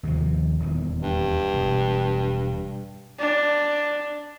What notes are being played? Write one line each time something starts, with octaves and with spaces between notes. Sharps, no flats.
D#2 C3 F3
D#1 E2 D#3
G2
E1
D4